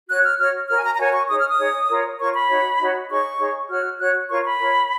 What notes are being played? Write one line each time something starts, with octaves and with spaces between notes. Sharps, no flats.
F#4 C#5 F#6
F6
F#4 C#5 F6
F#4 A#4 C#5 F6
G#5
A#5
A#5
F#4 A#4 C#5 G#5
C#6
D#4 G#4 C#5 D#6
F6
D#6
D#4 G#4 C#5
F4 A#4 C#5
F4 A#4 C#5 C#6
B5
D#4 F#4 C#5
D#4 F#4 C#5
D#4 G#4 C#5 C#6
D#4 G#4 C#5
F#4 C#5 F6
F#4 C#5 F#6
F4 A#4 C#5 C#6
B5
F4 A#4 C#5